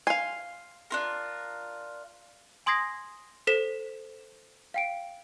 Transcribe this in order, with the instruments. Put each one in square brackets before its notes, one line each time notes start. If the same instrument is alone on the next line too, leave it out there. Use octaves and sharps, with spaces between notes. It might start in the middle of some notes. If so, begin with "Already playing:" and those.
[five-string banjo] F5 G#5 [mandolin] C6
[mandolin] D4 F4 A#4
[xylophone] G#5 C6 D#6 G#6 A#6 C7
A4 C5 B6 E7
F5 G5 D7